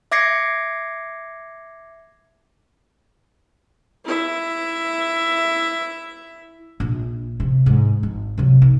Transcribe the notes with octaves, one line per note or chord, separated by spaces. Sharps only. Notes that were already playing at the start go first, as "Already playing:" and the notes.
E5 D6 G#6 A#6 C7 C#7
E4 E5
A#1
C3
G#2
G#1
C3 F#3
B1